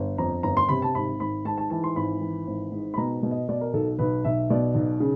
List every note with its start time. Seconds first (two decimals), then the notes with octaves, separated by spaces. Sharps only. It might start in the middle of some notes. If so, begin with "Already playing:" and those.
Already playing: G1
0.18 F2 A#5
0.43 G1 A#5
0.57 C6
0.69 C3 B5
0.82 A5
0.95 G#1 B5
1.20 G#1 B5
1.45 G#2 A5
1.58 A5
1.70 E3 A5
1.84 C6
1.96 G#1 B5
2.21 E3
2.47 G#1
2.72 G#2
2.94 B5
2.97 B2 A#5
3.23 B2
3.31 D#5
3.49 B2 D5
3.61 A#4
3.73 B1 A4
3.99 B1 B4
4.24 B1 E5
4.50 B2 D5
4.75 B1
5.00 C#3